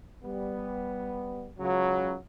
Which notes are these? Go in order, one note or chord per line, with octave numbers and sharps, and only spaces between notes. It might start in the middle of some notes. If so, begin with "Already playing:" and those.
G3 B3
C#2 C#3 F#3